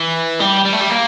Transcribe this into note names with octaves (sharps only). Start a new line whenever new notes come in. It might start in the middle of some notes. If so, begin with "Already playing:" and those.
Already playing: E3
G3
G3
A3
G3
A#3